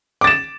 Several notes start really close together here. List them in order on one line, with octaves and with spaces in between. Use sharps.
D6 A6 E7